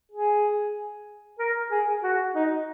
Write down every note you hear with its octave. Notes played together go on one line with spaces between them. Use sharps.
G#4
A#4
G#4
F#4
D#4